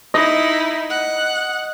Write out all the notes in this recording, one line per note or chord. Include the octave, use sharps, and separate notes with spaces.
D#4 E4 D#5
F#5